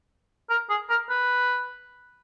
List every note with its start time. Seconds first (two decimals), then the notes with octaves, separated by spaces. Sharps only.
0.50 A#4
0.70 G#4
0.90 A#4
1.10 B4